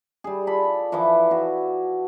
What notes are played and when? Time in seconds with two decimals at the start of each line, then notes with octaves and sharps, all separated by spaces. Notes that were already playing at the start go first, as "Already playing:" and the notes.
0.24 G3 G#4
0.47 F4 A4 D5 B5
0.92 E3 F3 E4 D6
1.31 F#4